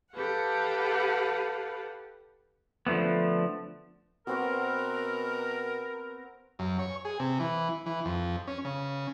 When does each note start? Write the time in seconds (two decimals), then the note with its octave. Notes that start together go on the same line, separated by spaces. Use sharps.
0.13 G4 A4 B4 F5 F#5
2.87 D3 F3 A3 B3
4.27 B2 B3 C4 F#4 A#4
6.59 F#2
6.79 C#5
7.05 G#4
7.20 C3
7.40 E3
7.86 E3
8.05 F2
8.47 C#4
8.65 C#3